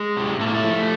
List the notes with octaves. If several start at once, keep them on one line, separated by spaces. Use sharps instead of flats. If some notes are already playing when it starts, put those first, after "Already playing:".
Already playing: G#3
C3
A2 A3
A#3
A3
F3